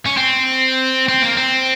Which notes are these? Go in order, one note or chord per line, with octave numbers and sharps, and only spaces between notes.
C#4
C4
C4
A#3
C4